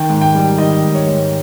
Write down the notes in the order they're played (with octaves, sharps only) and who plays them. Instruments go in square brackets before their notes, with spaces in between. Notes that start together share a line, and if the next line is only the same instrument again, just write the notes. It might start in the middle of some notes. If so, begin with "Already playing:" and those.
Already playing: [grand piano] D#3 G5
G#2
G5
G3
D#3 D#5
G#2
C#5
G#2